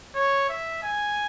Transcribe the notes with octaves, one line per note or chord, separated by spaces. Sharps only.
C#5
E5
G#5